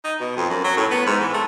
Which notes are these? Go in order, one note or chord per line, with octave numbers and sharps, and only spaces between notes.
D#4
B2
F2
F#2
F#3
A2
B3
G#2
E3
A3